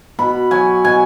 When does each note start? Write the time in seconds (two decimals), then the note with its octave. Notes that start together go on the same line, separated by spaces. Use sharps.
0.19 B2 B5
0.51 F#3 G#5
0.84 B2 G#5